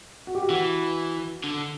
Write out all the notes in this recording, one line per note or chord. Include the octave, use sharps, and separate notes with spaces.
F#4
G4
F#4
E3
D3